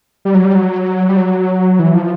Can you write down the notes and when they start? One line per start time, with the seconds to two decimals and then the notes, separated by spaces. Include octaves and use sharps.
0.25 G3
0.34 F#3
0.45 G3
0.55 F#3
1.09 G3
1.17 F#3
1.79 E3
1.94 F3